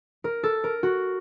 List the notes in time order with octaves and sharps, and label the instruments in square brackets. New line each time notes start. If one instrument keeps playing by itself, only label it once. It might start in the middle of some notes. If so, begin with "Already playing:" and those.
[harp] A#4
A4
A#4
F#4